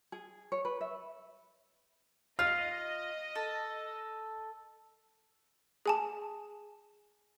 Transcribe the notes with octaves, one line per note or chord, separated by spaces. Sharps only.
G#4
C#5
B4
E5
F4 D#5 F6
A4
G#4 G#5 A5